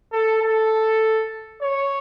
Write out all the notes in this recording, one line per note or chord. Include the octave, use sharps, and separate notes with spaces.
A4
A4
C#5